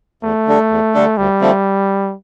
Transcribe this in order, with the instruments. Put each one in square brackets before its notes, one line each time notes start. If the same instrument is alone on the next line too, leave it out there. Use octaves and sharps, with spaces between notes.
[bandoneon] E2 [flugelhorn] A3
[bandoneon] D3 G3 D4 A4
E2
D3 G3 D4 A4
[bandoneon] D2 [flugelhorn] G3
[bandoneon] D3 F3 A3 C4